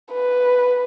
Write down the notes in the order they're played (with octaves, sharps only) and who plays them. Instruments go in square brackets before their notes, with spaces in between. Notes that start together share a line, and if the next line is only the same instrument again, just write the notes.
[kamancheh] B4